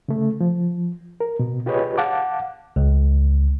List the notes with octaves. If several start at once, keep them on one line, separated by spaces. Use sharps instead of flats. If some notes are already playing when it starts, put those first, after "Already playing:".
C#3 A3
F3
A#4
B2
F4 G4 G#4 B4 C#5 D#5
F5 F#5 A5 D6
C#2